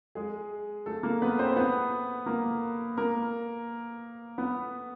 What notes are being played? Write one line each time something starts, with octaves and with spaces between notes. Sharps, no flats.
G#3 G#4
A3 A4
A#3 A#4
B3 B4
C4 C5
B3 B4
A#3 A#4
A#3 A#4
B3 B4